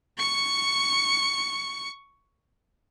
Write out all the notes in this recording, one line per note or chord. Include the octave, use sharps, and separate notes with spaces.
C#6 C#7